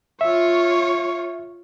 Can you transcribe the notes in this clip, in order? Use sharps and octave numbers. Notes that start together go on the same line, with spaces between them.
F4 C#5 E5